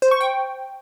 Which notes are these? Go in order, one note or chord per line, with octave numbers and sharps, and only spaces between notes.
C5
C#6
G5